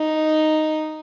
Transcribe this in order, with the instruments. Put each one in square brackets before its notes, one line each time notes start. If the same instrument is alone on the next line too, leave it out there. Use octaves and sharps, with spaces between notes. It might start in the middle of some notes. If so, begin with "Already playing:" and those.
Already playing: [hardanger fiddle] D#4